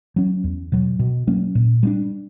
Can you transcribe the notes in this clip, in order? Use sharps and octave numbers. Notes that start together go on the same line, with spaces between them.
F#3 C#4
E2
B2 F#3
B2
F#3 A#3 C#4
A#2
G3 B3 D4